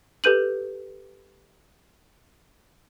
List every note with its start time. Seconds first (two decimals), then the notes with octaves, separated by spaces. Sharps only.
0.24 G4 A4 B4 G6 D#7 F#7